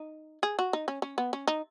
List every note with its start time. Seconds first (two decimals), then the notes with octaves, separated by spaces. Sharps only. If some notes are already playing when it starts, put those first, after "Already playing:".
Already playing: D#4
0.43 G#4
0.59 F#4
0.73 D#4
0.88 C#4
1.02 C#4
1.18 B3
1.33 C#4
1.48 D#4